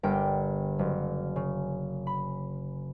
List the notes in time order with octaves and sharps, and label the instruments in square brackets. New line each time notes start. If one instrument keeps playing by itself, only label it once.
[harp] G1 D3 A#4 G5
F#1
C#3
B5